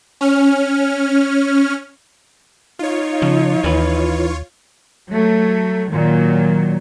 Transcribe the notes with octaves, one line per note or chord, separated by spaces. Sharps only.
C#4 F6
D#4 F4 C#5
C#3 F3
D#2 E3 B4
F#3 A3
A#2 D#3 F#3